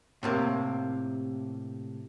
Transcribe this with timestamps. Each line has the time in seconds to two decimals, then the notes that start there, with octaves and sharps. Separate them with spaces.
0.23 A2 C3 A#3